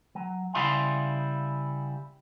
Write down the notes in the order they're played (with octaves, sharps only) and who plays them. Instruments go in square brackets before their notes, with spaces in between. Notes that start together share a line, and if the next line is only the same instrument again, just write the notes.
[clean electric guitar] F#3
C#3 G3 E4 F5 C6